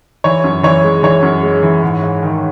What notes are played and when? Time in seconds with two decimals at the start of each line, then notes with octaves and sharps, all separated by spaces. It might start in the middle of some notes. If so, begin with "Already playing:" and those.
0.24 E3 C#5
0.44 F#2
0.63 E3 C#5
0.84 G#3
1.03 E3 C#5
1.23 F#2
1.43 G#3
1.63 E3
1.83 G#2
2.02 G#2
2.23 D#3